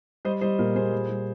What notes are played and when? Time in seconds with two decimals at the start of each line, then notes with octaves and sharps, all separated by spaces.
0.25 G3 C5 D#5
0.41 G3 C5 D#5
0.59 A#2 A#4
0.76 A#2 G#4 C5
0.92 G3
1.09 G3